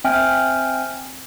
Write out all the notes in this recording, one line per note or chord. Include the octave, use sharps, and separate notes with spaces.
C4 E5 G5 G#5 F6